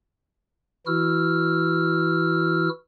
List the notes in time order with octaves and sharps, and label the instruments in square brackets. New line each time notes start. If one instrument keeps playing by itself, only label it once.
[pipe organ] E3 E4 F#4 E6 F6